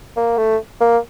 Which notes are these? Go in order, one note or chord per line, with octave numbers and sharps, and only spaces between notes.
A#3
A3
A#3